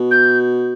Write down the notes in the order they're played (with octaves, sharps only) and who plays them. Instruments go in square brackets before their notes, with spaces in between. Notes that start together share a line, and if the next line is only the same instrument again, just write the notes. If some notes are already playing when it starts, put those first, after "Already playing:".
Already playing: [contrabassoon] B2
[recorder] G6